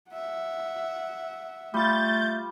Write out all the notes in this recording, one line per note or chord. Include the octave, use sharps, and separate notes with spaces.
E5 F#5
G3 A3 F4 G6 A6